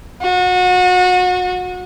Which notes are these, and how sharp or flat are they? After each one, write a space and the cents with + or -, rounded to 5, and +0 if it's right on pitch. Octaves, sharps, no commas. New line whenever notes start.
F#4 -30